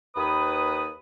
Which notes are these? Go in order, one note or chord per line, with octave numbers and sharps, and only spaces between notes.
D#2 B4 D#6